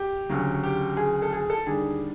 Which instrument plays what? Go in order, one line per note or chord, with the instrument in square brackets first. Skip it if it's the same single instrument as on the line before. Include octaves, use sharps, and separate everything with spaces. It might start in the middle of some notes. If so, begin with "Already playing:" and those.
Already playing: [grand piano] G4
D2 C#3 F#3
G4
G#4
A4
G#4
A4
D#2 D3 G3 G#4